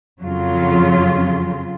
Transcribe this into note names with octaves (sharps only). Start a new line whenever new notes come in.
F2 C#3 F#3 F4